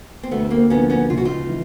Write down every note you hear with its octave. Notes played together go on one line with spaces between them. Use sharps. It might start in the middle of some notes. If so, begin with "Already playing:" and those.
C4
D2 A3 B3
A#3 C4
D3 F3 A#3 B3 C#4
B3 C#4
C#2 F4
F#4
D#4 F4
E3